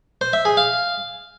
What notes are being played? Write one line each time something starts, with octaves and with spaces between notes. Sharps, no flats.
C5
E5
G#4
F5